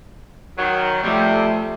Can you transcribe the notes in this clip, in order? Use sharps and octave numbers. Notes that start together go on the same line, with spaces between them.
D#3 F#3
C3 F3 G3 A3